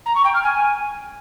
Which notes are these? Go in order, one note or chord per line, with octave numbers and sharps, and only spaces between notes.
A#5
C#6
G5
F6
G#5